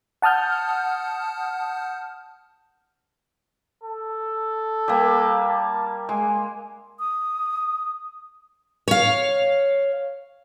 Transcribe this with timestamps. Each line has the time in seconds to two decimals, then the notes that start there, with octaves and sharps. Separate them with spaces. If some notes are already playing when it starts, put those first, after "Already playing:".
0.22 F#5 A5 D#6 F6 G6
3.84 A4
4.88 G3 A#3
5.50 A5
6.09 G#3 G#5
6.99 D#6
8.88 C#5 F5